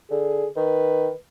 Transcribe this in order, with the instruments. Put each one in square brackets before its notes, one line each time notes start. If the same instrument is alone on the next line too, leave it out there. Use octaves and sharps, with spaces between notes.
[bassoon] D3 [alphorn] G#4
[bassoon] D#3 [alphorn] B4